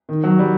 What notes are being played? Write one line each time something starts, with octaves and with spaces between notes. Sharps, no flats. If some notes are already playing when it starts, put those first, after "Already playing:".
D#3
F#3
G3